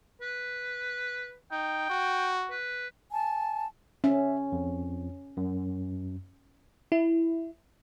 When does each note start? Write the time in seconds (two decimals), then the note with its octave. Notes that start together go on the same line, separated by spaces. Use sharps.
0.22 B4
1.52 D#4 G5
1.90 F#4
2.50 B4
3.11 G#5 A5
4.04 C#4 E5
4.52 F2
5.37 F#2
6.92 E4